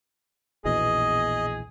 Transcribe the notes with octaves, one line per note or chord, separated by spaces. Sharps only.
A#1 E2 B2 G#4 D#5